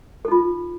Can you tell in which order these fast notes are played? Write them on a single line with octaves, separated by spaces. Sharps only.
A4 D#4 F4